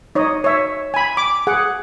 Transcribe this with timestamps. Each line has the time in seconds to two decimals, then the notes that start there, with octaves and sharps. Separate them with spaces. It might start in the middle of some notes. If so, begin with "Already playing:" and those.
0.15 D#4 C#5 D#5
0.44 C#5 E5
0.94 G#5 B5
1.17 D6
1.47 G#4 F#5